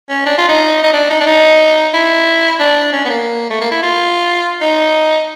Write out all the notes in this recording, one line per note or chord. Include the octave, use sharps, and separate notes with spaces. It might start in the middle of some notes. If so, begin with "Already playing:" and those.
C#4
D4
F4
D#4
D#4
D4
D#4
D4
D#4
E4
D4
C#4
B3
A#3
A3
A#3
E4
F4
D#4